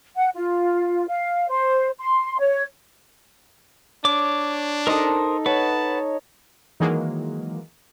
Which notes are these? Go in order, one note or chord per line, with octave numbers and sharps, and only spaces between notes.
F#5
F4
F5
C5
C6
C#5
D4 C#5 D6
D#4 A4 A#4 C5 D#6
B4 C#5 F#5 A5
D#3 E3 F#3 G#3 A#3